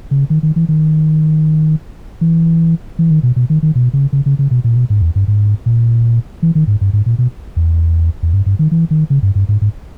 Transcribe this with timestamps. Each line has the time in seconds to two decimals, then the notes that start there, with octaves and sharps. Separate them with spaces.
0.11 C#3
0.30 D#3
0.43 D#3
0.56 E3
0.69 D#3
2.21 E3
2.99 E3
3.11 D#3
3.23 B2
3.36 B2
3.50 D#3
3.63 D#3
3.75 B2
3.93 C#3
4.13 C#3
4.26 C#3
4.39 C#3
4.51 B2
4.64 A#2
4.76 B2
4.90 G#2
5.02 E2
5.16 G2
5.28 G#2
5.66 A#2
6.43 E3
6.55 D#3
6.67 G#2
6.81 G2
6.93 G#2
7.06 A#2
7.19 B2
7.56 E2
8.23 E2
8.34 G2
8.46 G2
8.59 D#3
8.71 E3
8.91 D#3
9.10 C#3
9.23 G2
9.35 G2
9.49 G#2
9.62 G#2